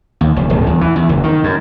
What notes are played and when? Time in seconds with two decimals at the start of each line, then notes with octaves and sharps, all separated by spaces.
0.21 D#2
0.36 F1
0.50 D1
0.67 E2
0.81 E3
0.96 E2
1.09 F#1
1.24 D#3
1.44 F#2